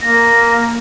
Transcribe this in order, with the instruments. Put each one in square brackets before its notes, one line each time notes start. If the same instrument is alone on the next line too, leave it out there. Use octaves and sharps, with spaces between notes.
[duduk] A#3 [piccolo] A#6